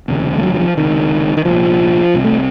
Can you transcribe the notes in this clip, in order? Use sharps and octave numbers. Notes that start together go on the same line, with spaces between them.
F1 D#2 C#3
A3
F#3
F#3
F3
C#2 C3 D#3
D#3
C2 A#2 F3
C2 C3
A3